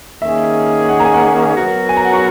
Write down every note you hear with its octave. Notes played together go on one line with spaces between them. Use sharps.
D#3 A#3 C#4 G#4 E5
F#5
A#5
G#5
F#5
F#3 B3 F#4 A#4
G#5
A#5
F#5
C#6